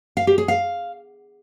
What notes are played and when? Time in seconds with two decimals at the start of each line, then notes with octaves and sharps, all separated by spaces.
0.17 F5
0.27 G4
0.38 G#4
0.48 F5